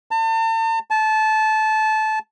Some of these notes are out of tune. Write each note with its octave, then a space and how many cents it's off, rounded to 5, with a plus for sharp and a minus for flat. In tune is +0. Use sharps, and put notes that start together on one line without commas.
A5 +40
A5 -20